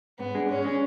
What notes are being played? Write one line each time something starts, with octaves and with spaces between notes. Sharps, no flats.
G#2 B3
G#3 D4 G#4
G#2 C#4
G#3 D4 G#4